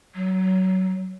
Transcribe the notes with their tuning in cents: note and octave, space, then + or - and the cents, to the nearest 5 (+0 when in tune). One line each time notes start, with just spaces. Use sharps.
F#3 +20